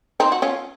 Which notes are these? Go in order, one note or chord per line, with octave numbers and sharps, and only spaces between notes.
C4 D#4
F#4
C#4 F4